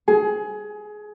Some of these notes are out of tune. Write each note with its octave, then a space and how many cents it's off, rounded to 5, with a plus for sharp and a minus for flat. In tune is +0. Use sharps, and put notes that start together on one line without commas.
G#4 +20